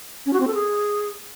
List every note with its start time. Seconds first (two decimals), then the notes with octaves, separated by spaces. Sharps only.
0.26 C#4
0.33 F#4
0.40 C4
0.47 A4
0.55 G#4